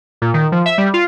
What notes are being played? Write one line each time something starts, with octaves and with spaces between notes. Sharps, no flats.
A#2
D#3
F3
E5
G3
F4